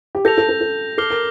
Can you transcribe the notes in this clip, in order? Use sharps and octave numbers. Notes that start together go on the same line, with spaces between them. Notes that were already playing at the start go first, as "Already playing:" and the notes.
G4
A4 G6 A#6 F7
A4
A4
A4
A4 D6 F6 C7 G7
A#4